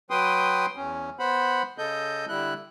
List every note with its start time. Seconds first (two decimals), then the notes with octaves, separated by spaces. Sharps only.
0.10 F#3 B4 G5 C6 D#6
0.77 E2 C#4
1.19 B3 C5 F#5 B5
1.78 C#3 A4 D#5 G6
2.29 D3 G3 E4 F#6